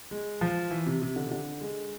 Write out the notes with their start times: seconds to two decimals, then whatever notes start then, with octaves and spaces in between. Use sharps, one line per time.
0.11 G#3
0.41 F3
0.71 E3
0.86 C3
1.02 C3
1.16 D3
1.26 C3
1.31 D3
1.61 G#3